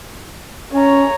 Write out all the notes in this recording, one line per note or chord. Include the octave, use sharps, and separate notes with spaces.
C#4 C#5 A#5